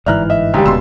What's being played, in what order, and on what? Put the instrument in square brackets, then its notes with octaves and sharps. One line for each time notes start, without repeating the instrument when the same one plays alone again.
[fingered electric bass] G1 G#2 E3 [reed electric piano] D5 E5 A#5 [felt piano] F6 F#6
[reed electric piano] D#5 [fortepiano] E5
[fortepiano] C#2 G3 [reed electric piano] D3 A#5 [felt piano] G4
[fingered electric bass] D#1 B2 [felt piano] C6 E6